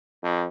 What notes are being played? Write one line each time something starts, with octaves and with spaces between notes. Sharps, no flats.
F2